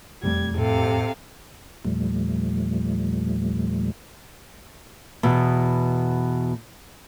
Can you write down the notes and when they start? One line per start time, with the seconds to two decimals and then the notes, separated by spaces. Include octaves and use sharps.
0.23 E1 F2 G3 A3 G#6
0.58 A2 C3 G4 A4 F5
1.85 E2 A#2 F3 G3 A3
5.23 E2 B2